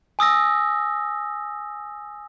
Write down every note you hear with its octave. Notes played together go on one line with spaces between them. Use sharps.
G#5 D#6 E6 A#6